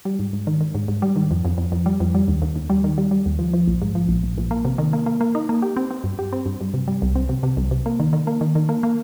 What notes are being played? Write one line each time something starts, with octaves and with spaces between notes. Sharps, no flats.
G3
G#2
G#2
D#3
D#3
G#2
G#2
G3
D#3
F2
F2
F2
F2
G3
F2
G3
D#2
D#2
D#2
G3
D#3
G3
G3
D#2
F3
F3
A#1
G#2
F3
A#1
A#1
A#1
A#3
C3
D#3
A#3
A#3
A#3
D#4
A#3
G4
C4
C4
G2
G4
C4
G2
G2
C3
G3
C2
C4
C3
C3
C2
C3
A#3
D#3
D#3
A#3
D#3
D#3
A#3
A#3